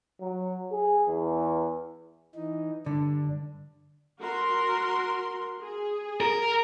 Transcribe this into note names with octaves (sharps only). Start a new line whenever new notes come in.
F#3
G#4
E2
E3 D#4
G2 D3 D4
F#4 A#4 C6
G#4
A#4